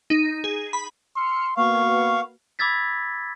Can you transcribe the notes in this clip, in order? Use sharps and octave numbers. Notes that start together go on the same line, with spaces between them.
D#4
G#4
B5
C6 E6 F6 C#7
A#3 B3 F#4 B4 F5 C#6
B5 D6 E6 G#6 A6 B6